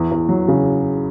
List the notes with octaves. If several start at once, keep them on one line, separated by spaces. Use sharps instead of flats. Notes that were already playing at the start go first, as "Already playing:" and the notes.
Already playing: E2
E2
F#3
C#3